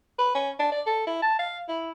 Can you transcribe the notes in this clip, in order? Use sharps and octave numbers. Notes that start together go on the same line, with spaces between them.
B4
C#4
D4
D5
A4
E4
A5
F5
E4